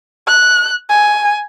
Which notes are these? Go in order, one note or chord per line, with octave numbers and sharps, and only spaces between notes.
F#6
G#5